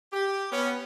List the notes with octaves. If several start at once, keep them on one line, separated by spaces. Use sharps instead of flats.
G4
B3 C#4